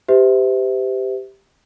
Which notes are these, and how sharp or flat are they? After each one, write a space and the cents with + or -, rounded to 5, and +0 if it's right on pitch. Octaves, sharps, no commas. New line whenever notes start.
G4 +0 C5 -40 E5 -25